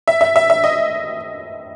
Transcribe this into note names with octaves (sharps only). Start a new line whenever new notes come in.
E5
E5
E5
E5
D#5